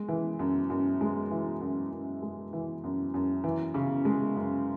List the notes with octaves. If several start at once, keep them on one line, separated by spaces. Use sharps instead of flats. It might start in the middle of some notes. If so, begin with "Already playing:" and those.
Already playing: G#3
E3
F#2
F#2
G#3
E3
F#2
F#2
G#3
E3
F#2
F#2
E3
C#3
G#3
F#2